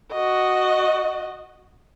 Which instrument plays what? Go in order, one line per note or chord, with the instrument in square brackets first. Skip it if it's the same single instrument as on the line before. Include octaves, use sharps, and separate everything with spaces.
[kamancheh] F#4 D#5